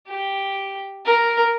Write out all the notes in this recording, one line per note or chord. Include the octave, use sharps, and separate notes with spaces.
G4
A#4